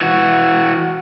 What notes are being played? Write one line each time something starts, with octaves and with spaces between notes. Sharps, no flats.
E3 F#4